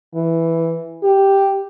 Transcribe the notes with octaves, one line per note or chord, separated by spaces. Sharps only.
E3
G4